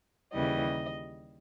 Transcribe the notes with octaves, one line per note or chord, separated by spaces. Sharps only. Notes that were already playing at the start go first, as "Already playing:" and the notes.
D#2 C#3 E3 G3 D#5